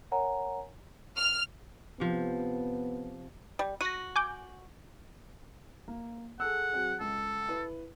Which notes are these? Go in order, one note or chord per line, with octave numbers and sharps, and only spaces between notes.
A#4 C#5 F#5 G#5 A#5
F6
C3 F3 B3
G3
F#4 A#6 D#7
G#5 D6 G6
A#3
G#4 A4 F#5 E6
F#3 C4 G#4
C#2 A4
E4 B4